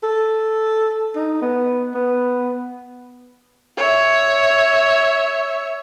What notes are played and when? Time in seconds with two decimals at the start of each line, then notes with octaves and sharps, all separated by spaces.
0.03 A4
1.16 D#4
1.42 B3
1.94 B3
3.77 C#5 E5